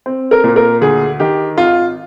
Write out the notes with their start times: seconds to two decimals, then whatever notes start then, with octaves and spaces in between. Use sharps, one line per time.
0.06 C4
0.31 A#4
0.44 A#2
0.56 A#4
0.81 D2 G#4
1.20 D#3 G4
1.57 G#1 F4